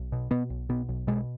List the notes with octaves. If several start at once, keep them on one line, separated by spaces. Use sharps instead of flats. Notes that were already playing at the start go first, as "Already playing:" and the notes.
Already playing: B1
B2
B2 B3
B1
B2 B3
B1
B2 G#3